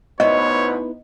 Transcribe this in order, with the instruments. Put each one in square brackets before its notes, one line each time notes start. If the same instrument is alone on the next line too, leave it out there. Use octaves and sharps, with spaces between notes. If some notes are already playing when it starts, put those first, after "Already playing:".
[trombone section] D2 B2 C5 [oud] B3 D#4 E4 [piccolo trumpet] C#5 [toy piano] D#5